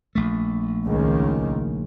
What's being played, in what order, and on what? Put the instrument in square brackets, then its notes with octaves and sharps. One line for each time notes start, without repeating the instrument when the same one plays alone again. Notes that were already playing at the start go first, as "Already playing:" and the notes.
[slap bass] A#1 A3
[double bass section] C#2 D#3